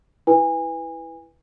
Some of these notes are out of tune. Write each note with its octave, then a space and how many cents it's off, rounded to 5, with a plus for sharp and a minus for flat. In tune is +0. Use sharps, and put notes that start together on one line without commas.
E4 +0 B4 +0 G#5 -30